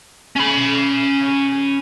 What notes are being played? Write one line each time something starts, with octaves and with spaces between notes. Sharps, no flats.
C#4 B5